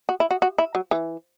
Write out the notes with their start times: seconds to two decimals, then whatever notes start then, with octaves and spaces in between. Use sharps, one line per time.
0.09 F#4
0.20 E4
0.31 F#4
0.42 F#4
0.58 E4
0.75 F#3
0.91 E3